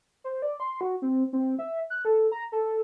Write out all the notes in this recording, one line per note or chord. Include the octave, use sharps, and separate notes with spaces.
C5
D5
C6
F#4
C4
C4
E5
F#6
A4
A#5
A4